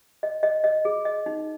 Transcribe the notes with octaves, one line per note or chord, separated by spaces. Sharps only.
D#5
D#5
D#5
G#4
D#5
D#4